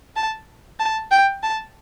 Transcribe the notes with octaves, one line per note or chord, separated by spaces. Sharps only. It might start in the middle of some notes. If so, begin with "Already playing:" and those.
A5
A5
G5
A5